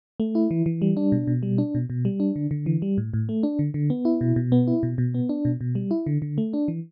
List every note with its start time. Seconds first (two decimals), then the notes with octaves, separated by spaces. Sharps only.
0.20 A3
0.35 E4
0.51 E3
0.66 E3
0.82 G3
0.97 D4
1.12 B2
1.27 B2
1.43 G3
1.58 D4
1.75 B2
1.90 B2
2.05 G3
2.20 D4
2.36 D3
2.51 D3
2.66 E3
2.82 G3
2.98 A2
3.14 A2
3.29 A3
3.43 D4
3.59 D3
3.74 D3
3.90 B3
4.05 E4
4.21 B2
4.36 B2
4.52 B3
4.67 E4
4.83 B2
4.98 B2
5.14 B3
5.29 D4
5.45 B2
5.61 B2
5.75 G3
5.91 E4
6.06 D3
6.22 D3
6.38 A3
6.53 D4
6.68 E3